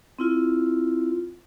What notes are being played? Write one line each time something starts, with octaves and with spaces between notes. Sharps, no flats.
C4 E4 F4